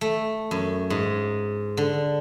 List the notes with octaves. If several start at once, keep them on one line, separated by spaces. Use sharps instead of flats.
A3
F#2
G#2
D3